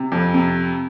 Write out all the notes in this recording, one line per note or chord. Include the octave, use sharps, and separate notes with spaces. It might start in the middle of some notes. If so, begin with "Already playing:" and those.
Already playing: C3
F2
C3